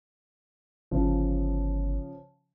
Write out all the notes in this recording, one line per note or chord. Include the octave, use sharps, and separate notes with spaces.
G1 C#3 F3